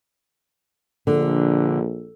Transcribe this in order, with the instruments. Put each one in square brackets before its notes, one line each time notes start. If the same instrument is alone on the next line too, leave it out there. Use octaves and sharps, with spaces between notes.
[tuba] A#1 [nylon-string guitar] D3